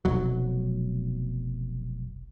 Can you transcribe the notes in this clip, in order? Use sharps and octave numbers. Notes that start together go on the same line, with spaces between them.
F1 B1 F#3